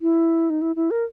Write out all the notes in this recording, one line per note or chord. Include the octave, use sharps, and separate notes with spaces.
E4
D#4
E4
E4
A#4